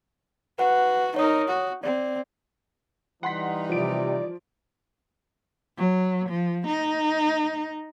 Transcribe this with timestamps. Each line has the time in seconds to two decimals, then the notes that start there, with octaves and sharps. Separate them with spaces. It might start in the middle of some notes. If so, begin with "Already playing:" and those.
0.59 F#4 B4 F#5
1.16 D#4 A#4 C#5 D#6
1.48 F#4
1.84 C4 D5
3.23 E3 G3 D#4 F#5 C6 B6
3.70 C3 F3 D5 D7
5.78 F#3
6.29 F3
6.67 D#4